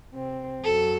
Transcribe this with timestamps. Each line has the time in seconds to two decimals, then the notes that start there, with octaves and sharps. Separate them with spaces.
0.13 C3 C4
0.64 F#2 F#3 A4